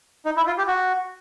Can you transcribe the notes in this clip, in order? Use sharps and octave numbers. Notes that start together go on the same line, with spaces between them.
D#4
E4
F4
G4
F#4